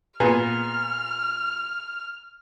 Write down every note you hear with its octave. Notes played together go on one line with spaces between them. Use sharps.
A#2 B3 G#4 F6